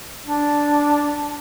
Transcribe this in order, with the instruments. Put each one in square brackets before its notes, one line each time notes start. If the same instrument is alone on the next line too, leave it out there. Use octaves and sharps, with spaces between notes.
[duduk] D4